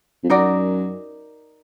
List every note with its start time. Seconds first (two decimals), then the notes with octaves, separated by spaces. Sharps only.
0.24 F2
0.29 F#2 D#4 F#4 A#4 D5